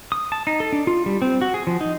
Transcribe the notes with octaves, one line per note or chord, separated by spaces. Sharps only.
D#6
A5
D#4
A4
D4
F4
G3
C4
F#4
G#4
F3
D#4